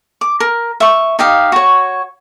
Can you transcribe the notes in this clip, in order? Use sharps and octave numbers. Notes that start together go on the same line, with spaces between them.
D6
A#4
E5 C#6
D#4 G4 F5
F#4 C#5